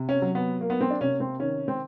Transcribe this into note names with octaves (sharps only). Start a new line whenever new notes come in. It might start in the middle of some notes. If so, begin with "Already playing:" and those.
Already playing: C3
C#4
F#3
B3
A#3
B3
C4
D4
C3 C#4
C4
D#3 C#4
C4